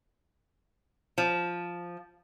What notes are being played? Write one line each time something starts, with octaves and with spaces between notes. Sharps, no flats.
F3